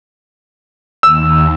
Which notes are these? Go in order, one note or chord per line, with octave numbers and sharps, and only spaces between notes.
D#2 E6